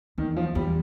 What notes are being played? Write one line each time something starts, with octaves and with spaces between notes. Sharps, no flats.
E2 D#3
F3
E2 G3